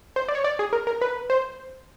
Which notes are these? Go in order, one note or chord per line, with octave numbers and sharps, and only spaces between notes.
C5
D5
C#5
D5
G#4
A#4
A#4
B4
C5